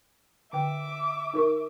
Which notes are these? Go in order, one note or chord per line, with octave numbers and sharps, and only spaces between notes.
D3 E5 G5 D6
D#4 A#4 C#6